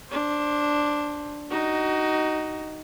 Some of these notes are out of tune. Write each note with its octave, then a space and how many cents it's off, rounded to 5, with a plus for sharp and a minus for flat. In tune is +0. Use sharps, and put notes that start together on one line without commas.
D4 +0 C5 +20
D#4 +0 F#4 +30